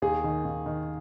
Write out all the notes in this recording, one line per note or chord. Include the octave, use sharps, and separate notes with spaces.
D#2 G#4
D#3
D#2
D#3